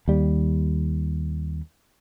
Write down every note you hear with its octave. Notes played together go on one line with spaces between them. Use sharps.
D#2 G3